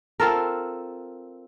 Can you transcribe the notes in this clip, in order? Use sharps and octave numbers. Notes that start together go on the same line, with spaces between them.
C4 F4 A4 A#4